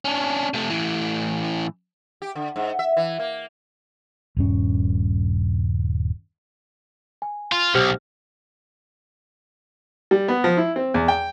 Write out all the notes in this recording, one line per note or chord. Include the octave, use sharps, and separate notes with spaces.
C#4 D4
C3 A3
A2 E3
G4
D3
G#2
E5
E3
A#3
D#1 G2 C#4
G#5
F4
B1 G4 C5 F6
G3
B3
F3
E4
C4
E2
G5